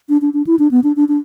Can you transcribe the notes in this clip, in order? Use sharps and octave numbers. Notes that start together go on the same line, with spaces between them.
D4
D4
D4
E4
D4
B3
D4
D4
D4